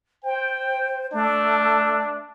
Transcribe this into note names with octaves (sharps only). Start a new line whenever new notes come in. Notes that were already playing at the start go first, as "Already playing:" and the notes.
C5 G5
A3 D4